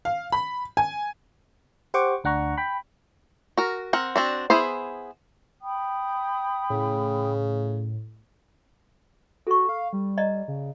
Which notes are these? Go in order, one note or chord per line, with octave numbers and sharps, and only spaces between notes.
F5
B5
G#5
G4 C5 F#5 C#6 D6
D2 D4 F#5 A#5 C#6
G5 B5
F#4 A#4
C4 A#4 F#5
C4 D4 F#4
B3 E4 G#4 C5
G5 B5 D#6
A2 C#3
F#4 A4 C#6
F5
G3
D5 D#5 A#5
C#3